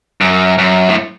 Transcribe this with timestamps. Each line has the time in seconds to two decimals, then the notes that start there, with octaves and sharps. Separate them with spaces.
0.21 F#2
0.58 F#2
0.89 A2